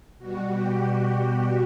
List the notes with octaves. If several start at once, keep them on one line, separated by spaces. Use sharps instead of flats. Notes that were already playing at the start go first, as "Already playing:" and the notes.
B2 G3 F#4
G4